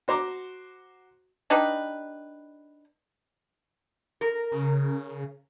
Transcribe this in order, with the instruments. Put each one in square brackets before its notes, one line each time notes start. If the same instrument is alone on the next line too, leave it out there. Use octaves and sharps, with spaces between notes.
[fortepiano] F#4 C5 A#5 D6
[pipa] D4 D#4 G4 B4
[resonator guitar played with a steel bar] A#4
[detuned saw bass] C#3